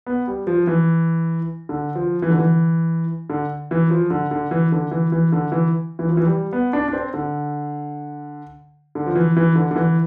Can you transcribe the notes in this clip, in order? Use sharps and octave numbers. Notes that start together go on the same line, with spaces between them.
B3
G3
F3
E3
D3
F3
E3
D3
E3
D3
E3
F3
D3
D3
E3
D3
E3
E3
D3
E3
E3
F3
E3
G3
B3
D4
D4
C4
D3
D3
F3
E3
E3
D3
D3
E3